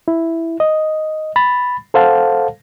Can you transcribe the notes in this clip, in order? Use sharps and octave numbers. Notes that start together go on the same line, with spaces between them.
E4
D#5
B5 A6
A4 C5 F5 F#5 A5